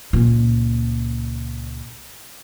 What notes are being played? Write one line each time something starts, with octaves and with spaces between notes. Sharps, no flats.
C#2 A#2